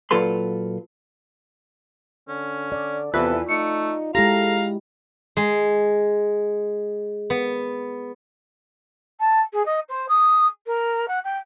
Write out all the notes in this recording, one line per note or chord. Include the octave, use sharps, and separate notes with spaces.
A#2 F#3 F4 A4 B4 C6
D3 C#4
D5
E2 C3 E3 F4 A4 B4
A3 D#4 C#7
G#3 E4 G4 A4 F5 A#5 A#6
G#3
B3
A5
G#4
D#5
C5
D#6
A#4
F#5
G5